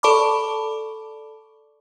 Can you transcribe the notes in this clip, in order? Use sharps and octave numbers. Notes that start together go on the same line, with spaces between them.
A4 D5 A5 B5 C#6 D6